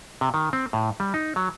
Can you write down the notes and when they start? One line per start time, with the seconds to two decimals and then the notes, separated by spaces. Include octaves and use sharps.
0.21 C3
0.34 D#3
0.53 C4
0.73 A2
1.00 G3
1.14 D#4
1.36 F#3